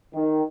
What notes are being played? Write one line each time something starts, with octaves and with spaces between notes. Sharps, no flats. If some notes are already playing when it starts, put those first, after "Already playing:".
D#3